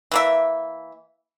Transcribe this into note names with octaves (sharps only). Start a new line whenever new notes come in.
E3 A#3 E5